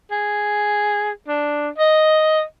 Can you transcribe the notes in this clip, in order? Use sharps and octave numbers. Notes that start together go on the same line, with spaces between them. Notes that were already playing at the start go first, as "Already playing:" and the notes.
G#4
D4
D#5